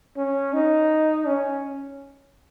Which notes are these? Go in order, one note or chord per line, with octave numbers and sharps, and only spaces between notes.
C#4
D#4
C#4